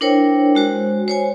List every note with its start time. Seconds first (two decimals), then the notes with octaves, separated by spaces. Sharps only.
0.01 D4 E4 A#4 C5 C#5 G5
0.55 G#3 F#4 C5
1.08 C5 C#5 G#5